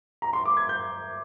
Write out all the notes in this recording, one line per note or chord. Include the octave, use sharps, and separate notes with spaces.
A#5
C6
D6
G#6
G6